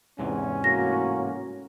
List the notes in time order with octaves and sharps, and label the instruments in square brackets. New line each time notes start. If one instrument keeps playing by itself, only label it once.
[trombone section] E2 [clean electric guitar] G#2 C3 E3 [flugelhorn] C#4
[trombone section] A2 A#3 F#4 [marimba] A#6